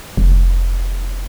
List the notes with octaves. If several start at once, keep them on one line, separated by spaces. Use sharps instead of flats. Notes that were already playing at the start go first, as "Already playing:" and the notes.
F1